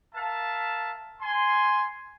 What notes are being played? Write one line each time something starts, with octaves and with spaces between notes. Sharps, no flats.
A#4 E5 F5 A5
G#5 C6